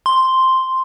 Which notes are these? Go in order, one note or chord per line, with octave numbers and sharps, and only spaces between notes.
C6